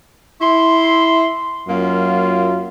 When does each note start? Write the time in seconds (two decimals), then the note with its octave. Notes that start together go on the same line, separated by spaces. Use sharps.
0.41 E4 C6
1.68 F#2 F#3 A#3 F4